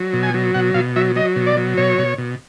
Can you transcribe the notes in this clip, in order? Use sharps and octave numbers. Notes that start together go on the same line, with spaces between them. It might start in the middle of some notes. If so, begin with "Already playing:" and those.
Already playing: F#3
B2
G#5
F#3
B2 F#5
B2 F5
F#3 E5
F#3 D#5
B2
D5
F#3
B2 C#5
B2
B2